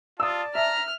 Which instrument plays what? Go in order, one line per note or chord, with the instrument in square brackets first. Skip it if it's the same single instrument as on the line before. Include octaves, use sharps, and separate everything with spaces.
[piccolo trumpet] F4 [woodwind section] D5 A5 [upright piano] D#6 E6
[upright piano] E5 [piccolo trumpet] A#5 [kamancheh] F6